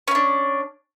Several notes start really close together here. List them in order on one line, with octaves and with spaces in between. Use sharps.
C#4 E4 D4